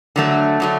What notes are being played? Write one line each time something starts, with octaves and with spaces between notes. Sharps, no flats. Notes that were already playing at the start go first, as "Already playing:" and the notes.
D3 F#3 A3
D3 F#3 A3